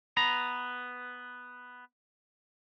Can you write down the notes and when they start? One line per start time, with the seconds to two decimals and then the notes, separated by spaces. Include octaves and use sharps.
0.17 B3 B4 A#5